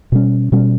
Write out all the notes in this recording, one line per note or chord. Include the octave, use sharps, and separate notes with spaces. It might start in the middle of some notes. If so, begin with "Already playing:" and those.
B2 G3 C#4
B2 G3 C#4